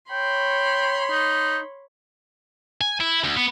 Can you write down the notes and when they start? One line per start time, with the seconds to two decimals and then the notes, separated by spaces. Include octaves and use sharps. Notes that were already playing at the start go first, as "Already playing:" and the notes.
0.11 C#5 G5 B5 C6
1.10 D#4
2.81 G#5
3.01 E4
3.24 D2
3.37 B3